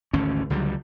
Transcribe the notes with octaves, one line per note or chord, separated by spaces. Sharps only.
G#1 D2 D3 C#4
C#2 D3 F#3 G3